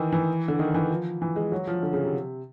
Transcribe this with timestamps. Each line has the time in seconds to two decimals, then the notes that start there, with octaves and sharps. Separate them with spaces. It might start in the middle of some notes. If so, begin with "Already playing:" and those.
Already playing: D#3 E3
0.13 E3
0.48 D3
0.59 D#3
0.75 E3
0.90 F3
1.22 E3
1.36 G#3
1.52 F#3
1.67 F3
1.83 D3
1.93 C#3
2.03 C3